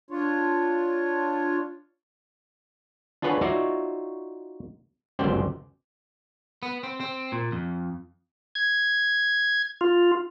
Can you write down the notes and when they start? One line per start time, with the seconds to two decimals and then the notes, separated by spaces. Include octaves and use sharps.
0.11 D4 F4 C#5
3.22 D4 F4 G#4 B4 C#5 F#5
3.41 D#4 F4 F#4 C#5 D5 E5
5.19 G1 C#2 F#2 C5 D5 G5
6.63 B3
6.83 C4
7.00 C4
7.32 A#2
7.52 F2
8.55 G#6
9.81 F4